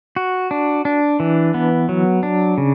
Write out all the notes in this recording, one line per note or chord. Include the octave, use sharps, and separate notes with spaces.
F#4
D4
D4
E3
B3
F#3
D4
C#3